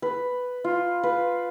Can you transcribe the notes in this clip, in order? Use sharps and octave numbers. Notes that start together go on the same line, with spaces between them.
B4
F4
B4